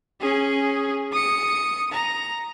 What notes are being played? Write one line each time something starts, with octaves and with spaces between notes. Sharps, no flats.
C#4 G#4
D#6 C#7
A#5